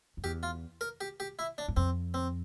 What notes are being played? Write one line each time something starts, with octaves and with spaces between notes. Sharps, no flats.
F2
E2 G4
F4
A#4
G4
G4
E4
D4
G2
F2 C4
C4